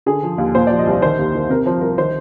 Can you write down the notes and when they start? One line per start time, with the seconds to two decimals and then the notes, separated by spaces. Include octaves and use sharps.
0.06 D3 G#4
0.23 F3
0.38 D#2
0.55 A#2 C5
0.67 F3 D5
0.79 D#5
0.87 C2 D5
1.02 D#3 C5
1.19 D#2
1.35 D#3
1.49 C3 A#4
1.66 F3 C5
1.81 C2 A#4
1.98 D#3 C5